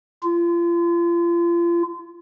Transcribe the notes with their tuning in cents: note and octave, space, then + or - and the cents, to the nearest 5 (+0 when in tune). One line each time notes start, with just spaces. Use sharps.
F4 -35